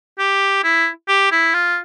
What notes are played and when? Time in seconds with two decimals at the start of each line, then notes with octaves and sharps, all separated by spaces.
0.19 G4
0.64 E4
1.08 G4
1.32 E4
1.54 F4